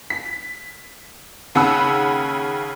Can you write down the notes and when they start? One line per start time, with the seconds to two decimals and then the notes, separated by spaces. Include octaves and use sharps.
0.10 B6
1.55 D#2 C#3 F#5 B5 E6